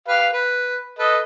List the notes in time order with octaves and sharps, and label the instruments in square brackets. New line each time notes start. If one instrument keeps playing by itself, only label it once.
[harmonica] G4 B4 F5
B4
A4 B4 D#5